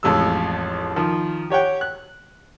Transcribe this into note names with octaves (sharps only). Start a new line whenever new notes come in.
A1 F2 G#3 E6
D#3 F3
G4 C#5 F#5 G5
F#6